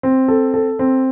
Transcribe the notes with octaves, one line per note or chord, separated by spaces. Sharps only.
C4
A4
A4
C4